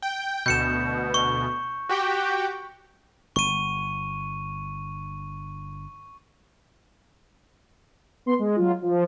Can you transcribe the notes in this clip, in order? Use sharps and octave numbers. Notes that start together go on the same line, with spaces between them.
G5
D2 B2 G6 C#7 E7
C#6
F#4 G4 G5
G1 C#6 D#7
B3 C6
G#3
F#3 F4
F3